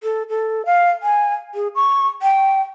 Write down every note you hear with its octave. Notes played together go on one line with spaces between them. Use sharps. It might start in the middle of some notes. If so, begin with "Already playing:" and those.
A4
A4
F5
G#5
G#4
C#6
G5